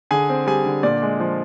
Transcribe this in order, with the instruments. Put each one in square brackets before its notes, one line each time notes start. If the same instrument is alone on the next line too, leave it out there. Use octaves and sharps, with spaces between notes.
[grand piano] D3 G#4 G#5
C4
G3 G#4 G#5
D3
A#2 D5
G#3
F3